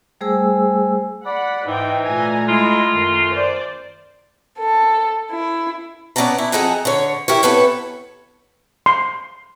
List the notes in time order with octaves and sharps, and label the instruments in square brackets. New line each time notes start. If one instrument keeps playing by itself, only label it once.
[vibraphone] G3 A3 G#4 C5 G#5 E6
[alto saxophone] D5 [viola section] F#5 B5
[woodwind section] G#2 [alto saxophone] E3 [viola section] D#4 G5
[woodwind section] A#2 G#5 [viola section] A3 A#5
[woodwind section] G#3 E4 [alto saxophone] F4
[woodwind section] F#2 D#3
[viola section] C5 D5
[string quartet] A4
E4
[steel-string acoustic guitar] B3 C#4 D5 F#5 A5 A#5
E4
F2 G#4 A4 D#5 F#5 A#5
D3 C#5
E4 G4 A#4 C#5
C3 B3 A4 B4 C#5
[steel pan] C6